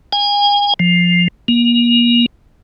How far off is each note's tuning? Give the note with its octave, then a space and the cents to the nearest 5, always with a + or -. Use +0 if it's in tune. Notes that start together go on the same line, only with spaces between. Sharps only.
G#5 -30
F3 +10
A#3 +35